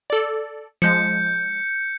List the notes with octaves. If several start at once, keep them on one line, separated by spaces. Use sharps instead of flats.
A4 D5
F3 G#3 G6 C#7